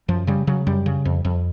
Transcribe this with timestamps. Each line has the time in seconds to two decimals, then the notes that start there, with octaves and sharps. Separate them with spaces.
0.08 F#2 F3
0.27 C#3 G3
0.47 C#3 F#3
0.67 F#2 G3
0.86 C#3
1.05 F2
1.25 F2